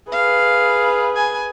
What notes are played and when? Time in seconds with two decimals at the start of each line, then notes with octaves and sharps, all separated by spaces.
0.12 G#4 B4 F5
1.15 G#5